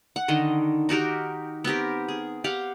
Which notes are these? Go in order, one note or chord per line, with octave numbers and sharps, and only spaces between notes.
F#5
D3 D#3 D#5
D#4 F#4 G4 A#4
B3 C4 G4 A#4
G#4
G4 F5 F#5